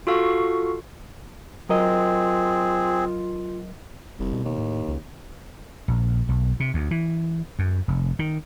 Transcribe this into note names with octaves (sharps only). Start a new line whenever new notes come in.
F4 F#4 A4 F5 C#6
F#3 C4 F4 G#4 A#4 D#5
F1 C2
B2
D#2
A2
C#2
A#1
B1
C3
D2
E3
F#2
F1
D#3